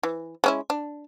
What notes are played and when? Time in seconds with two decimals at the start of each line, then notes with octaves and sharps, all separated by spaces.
0.03 E3
0.44 G#3 C#4 E4
0.70 D4